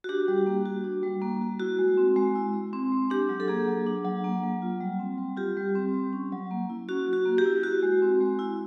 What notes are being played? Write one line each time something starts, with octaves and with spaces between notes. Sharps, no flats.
F#4
D4 G4
G3
A#3
F#4
D4
G3
A#3
F#4
E4 F#4
G#3
C4
G#3
E4
G#3
C4
G#3
D4 G4
F#3
A4
A#3 G#4
F#3
D4
F#3
A#3
F#3
F4
G3
C4
G3
F4 G4
G3
C4
G3
C#4
F#3
A#3
E4
C#4 F#4
F#3
F#4
A#3
G4
E4
E4 F#4
G#3
C4
G#3
E4